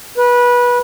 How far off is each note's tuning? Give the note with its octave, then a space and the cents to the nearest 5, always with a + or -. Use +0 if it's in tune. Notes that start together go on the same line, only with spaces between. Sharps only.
B4 -20